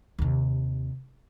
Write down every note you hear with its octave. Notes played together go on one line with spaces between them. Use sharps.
D#2 C3